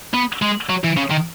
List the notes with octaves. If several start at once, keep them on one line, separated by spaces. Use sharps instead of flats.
B3
G#3
F#3
E3
C#3
D#3